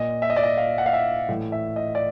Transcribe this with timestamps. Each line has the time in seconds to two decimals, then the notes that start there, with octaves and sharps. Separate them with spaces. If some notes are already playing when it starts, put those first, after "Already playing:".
Already playing: A#2 D#5
0.22 E5
0.30 D#5
0.36 D5
0.43 D#5
0.57 F5
0.78 F#5
0.86 F5
0.93 E5
1.29 A2 E3
1.52 E5
1.76 D#5
1.95 D5